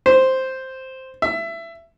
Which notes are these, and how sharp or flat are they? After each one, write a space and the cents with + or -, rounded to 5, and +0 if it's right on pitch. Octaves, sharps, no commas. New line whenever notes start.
C5 +0
E5 +20